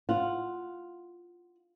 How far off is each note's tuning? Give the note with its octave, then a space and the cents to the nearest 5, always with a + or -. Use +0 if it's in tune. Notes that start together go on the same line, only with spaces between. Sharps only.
F4 +0 F#5 +0